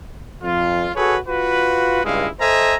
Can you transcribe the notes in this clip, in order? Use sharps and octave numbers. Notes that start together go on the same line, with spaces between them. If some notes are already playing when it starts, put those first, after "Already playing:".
F2 F4
F#4 G#4 A4 B4 C#5
F4 F#4 B4
C#2 G2 G#3 E4 D#5 F5
A4 C5 D#5 E5 G#5 A#5